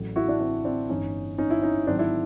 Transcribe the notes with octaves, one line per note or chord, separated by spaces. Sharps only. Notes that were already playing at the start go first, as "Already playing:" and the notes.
Already playing: A1 A2 F#3
E4 F#4
D4 E4
C4 D4
C4 D4
G1 G2 E3 C#4 D#4
C#4 D#4
E4
C#4 D#4
G#1 G#2 D#3 F#3 C4 D4
D4 E4